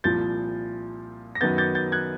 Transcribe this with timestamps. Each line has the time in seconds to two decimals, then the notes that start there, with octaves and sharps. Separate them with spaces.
0.04 C2 A#2 F3 G6 A6
1.35 A#6
1.41 F#2 D#3 F#3 B3 G6 A6
1.58 G6 A6
1.75 G6 A6
1.92 F#6 G#6